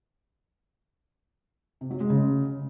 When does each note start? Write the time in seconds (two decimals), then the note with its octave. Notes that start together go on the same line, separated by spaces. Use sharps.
1.81 C3
1.91 F#3
2.00 G#3
2.10 C#3